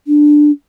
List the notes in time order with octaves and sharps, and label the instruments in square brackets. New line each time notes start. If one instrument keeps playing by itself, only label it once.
[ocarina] D4